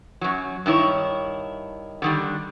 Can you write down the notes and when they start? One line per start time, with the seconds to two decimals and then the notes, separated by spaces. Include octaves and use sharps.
0.21 F#2 F#3
0.66 G2 D#3 E4 C#5
2.02 D3 D#3 G3